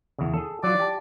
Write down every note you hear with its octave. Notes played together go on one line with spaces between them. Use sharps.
E2 C#3
G#4 A4
F#3 F4 D5
G4 A5